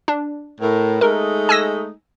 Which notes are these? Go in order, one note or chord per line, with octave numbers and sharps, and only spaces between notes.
D4
A2 A#4
G#3 A3 D#4 A#4
G#5 E6 A#6